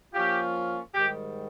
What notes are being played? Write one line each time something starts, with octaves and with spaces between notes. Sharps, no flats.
F3 A#3 C#4 F4 G4
G#2 D#3 G3 G4